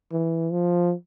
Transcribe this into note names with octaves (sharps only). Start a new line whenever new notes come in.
E3
F3